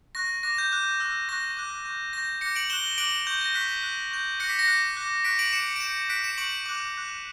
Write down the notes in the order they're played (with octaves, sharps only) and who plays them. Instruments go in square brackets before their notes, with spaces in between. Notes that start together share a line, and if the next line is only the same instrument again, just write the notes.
[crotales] C#6 F#6 A#6
D6 F#6 A#6
G6
D6 F#6
C#6 E6 G6
C#6 F#6 A#6
D6 F#6
C#6 G6
C#6 G6 A#6
D6 F#6 A#6 C#7
D7 F#7
C#6 F#6 E7 G7
D6 F#6 D7 F#7
C#6 G6
A#6
C#6 F#6 B6
C#6 F#6
C#6 G6
F#6 A#6 C#7
D6
B6
A#6 C#7
D6 F#6
D6 F#6
C#6 F#6 B6 D7
D7 F#7
D6 G6 C#7 E7
D7
D6 G6 C#7 E7
D6 F#6 B6 D7
C#7 E7
C#6 G6 D7 F#7
D6 F#6
C#6 F#6